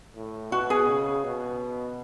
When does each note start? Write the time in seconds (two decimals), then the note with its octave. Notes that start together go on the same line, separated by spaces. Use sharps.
0.16 A2
0.51 B2 F#4
0.70 G#4
0.88 C#3
1.24 B2